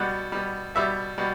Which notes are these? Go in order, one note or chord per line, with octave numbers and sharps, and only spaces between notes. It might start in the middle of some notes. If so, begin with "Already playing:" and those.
Already playing: B2 G3 F#5
B2 G3
B2 G3 E5
B2 G3